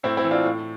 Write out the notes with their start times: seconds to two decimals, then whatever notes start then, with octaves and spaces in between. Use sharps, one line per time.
0.03 A2 C4 E4
0.17 C4 E4
0.24 E3
0.31 D4 F4
0.45 A2